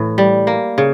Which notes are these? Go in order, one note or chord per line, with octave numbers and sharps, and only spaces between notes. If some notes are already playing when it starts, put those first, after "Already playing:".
Already playing: A2 E3
G3
A#3
C#3